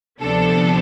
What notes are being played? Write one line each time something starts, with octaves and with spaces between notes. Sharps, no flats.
D2 C3 F3 B3 D4 A4